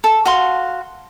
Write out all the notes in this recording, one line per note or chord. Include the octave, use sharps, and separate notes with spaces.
A4
F#4 F5 C6